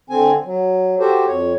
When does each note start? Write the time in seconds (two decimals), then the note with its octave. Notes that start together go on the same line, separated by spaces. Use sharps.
0.10 D3 C4 G#5
0.45 F#3
1.00 F#4 G4 A4 C5
1.27 F2 C#5